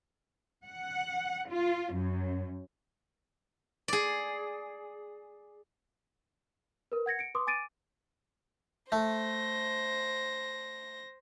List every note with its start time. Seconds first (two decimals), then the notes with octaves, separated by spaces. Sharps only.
0.66 F#5
1.50 F4
1.94 F#2
3.88 G#4 D5
6.92 A#4 B4
7.06 F#5 G#6 A#6 C#7
7.19 C#7 D7
7.35 B4 C6 D6 D#6
7.47 G#5 D6 A6 D7 D#7
8.92 A3 C5 A#6